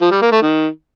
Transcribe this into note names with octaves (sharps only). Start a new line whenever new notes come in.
F3
G3
A#3
A3
D#3